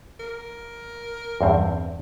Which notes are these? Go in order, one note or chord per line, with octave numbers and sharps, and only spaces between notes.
A#4
E2 G2 C4